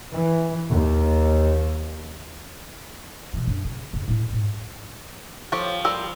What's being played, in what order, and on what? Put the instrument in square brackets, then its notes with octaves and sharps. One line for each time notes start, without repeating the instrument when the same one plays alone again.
[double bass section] E3
D#2
[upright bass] B2 E3
F#2 D4
C#3
F2 C#3
A2 E4
E2 G#2
[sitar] F3 [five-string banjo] G4 A4 C#5
[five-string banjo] G3 A#4 C5 [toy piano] E6